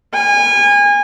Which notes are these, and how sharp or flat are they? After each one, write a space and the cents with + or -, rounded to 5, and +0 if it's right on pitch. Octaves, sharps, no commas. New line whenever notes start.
G#5 -30